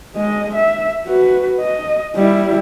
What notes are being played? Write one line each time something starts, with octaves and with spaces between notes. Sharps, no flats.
G#3 D#5
E5
F#4 B4
D#5
G3 E4